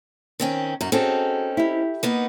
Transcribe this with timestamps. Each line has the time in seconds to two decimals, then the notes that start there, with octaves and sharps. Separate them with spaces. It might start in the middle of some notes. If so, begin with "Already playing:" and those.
0.40 D#3 C4 C#4
0.81 F#2 D#4 F#4
0.92 C4 C#4 D#4 F#4 G#4 A4
1.57 E4 G4
2.03 A#3 B3 D#4